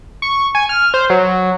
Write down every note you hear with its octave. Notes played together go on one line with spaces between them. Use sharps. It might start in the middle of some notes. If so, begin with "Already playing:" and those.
C#6
G#5
F6
C5
F#3